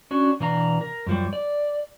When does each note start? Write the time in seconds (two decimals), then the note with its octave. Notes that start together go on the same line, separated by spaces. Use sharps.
0.11 C#4 D4 F#4
0.40 B2 E3 D4 F5 A#5
0.81 A#4
1.07 F#2 F3 G3
1.33 D5